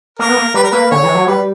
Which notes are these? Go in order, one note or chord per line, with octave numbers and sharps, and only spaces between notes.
A#3 A#4
B3
A#3
G3 B4
A#4
A#3 B4
D3 C#5
E3
F#3
G3 B4